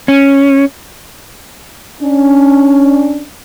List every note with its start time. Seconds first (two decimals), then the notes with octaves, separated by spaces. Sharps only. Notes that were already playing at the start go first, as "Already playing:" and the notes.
0.08 C#4
2.01 C#4 D4